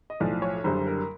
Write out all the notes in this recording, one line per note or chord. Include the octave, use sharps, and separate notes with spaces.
D#5
B1 A2 F3 D5
C#5
F#1 F#2 D3 G3 C5
A#4